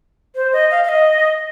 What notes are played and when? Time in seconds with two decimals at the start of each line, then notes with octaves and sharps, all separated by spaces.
0.35 C5
0.53 D#5
0.71 F5
0.84 F5
0.89 D#5